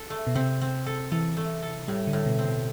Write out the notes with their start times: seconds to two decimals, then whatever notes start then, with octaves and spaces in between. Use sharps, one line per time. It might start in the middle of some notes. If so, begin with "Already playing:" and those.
Already playing: A4
0.10 A3
0.27 B2
0.35 C3 C4
0.61 C4
0.86 A4
1.12 E3 A4
1.37 A3
1.62 A4
1.88 A2 G3
2.07 D3
2.13 A2
2.26 B2
2.39 C4
2.45 B2